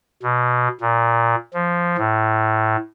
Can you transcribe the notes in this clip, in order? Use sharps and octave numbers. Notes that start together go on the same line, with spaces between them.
B2
A#2
F3
A2